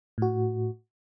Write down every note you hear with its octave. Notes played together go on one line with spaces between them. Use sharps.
A2 F#4